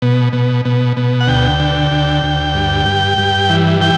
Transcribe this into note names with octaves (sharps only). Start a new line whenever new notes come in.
B2
B2
B2
B2
F#5
D2 G5
D3
D2
D2
G2
G2
G2
E3
E3 G5